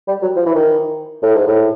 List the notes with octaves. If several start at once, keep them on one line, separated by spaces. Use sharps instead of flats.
G3
F#3
F3
E3
D#3
A2
G#2
A2